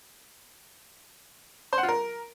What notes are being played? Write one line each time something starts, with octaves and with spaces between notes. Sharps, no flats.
C5
F#5
F4
A#4